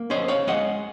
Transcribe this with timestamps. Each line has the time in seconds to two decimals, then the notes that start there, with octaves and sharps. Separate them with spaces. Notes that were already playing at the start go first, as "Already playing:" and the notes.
Already playing: A#3
0.10 C#4 C5 D#5
0.28 C#5 F5
0.47 G#3 D#5 F#5